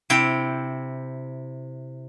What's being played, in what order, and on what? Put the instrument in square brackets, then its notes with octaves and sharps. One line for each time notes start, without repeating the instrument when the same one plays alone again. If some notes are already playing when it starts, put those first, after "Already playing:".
[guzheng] C3 E4 G5